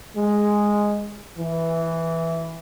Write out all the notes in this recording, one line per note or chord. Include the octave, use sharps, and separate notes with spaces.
G#3
E3